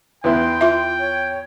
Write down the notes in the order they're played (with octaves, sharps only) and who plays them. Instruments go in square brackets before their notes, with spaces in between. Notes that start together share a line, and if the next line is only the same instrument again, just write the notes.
[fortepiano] E2 B3 E4 [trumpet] G5 [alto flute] C6
[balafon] F4 E5
[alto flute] C#5